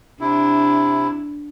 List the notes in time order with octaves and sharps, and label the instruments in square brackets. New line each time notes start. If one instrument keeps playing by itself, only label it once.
[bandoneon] C3 E4 [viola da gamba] D4